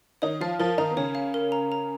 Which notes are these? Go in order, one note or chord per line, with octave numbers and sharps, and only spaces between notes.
D#3 D#4 C#5
F3 F4 F5
F3 F4 A#4
D#3 D#4 A#5
B3
C#3 C#4 C#5
F5
A#4
A#5
A#5